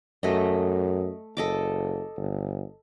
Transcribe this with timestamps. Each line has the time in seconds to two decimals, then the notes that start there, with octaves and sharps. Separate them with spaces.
0.23 F#2 A3 D#5
1.37 F#1 A4 D#5 D6
2.17 G1